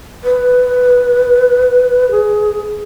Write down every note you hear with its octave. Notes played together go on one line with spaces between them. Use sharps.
B4
G#4